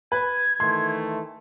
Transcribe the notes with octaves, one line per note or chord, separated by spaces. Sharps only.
B4 G#6
D#3 E3 A3 C6